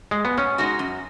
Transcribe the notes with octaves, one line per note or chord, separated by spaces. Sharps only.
G#3
B3
B2 C#4
G#3 D#4 F#4
F#2